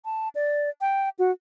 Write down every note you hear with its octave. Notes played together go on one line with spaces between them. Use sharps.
A5
D5
G5
F#4